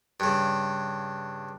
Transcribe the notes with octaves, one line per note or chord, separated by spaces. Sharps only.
G2 C#3